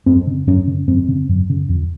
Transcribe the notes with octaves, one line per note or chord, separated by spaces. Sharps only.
F#2 C4
C#3
F#2 C#4
C#3
F#2 C4
C#3
F#2
C#3
F2